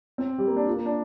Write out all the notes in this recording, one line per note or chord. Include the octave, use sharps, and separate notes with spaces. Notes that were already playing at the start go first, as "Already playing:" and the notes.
C4
G3
A#3
D4
F4
A#3
D4